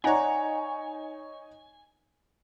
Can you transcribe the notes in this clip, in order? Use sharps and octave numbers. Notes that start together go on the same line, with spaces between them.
D#4 C#5 D5 F#5 G#5 A#5